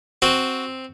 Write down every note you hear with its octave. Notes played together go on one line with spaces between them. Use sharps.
C4 F#4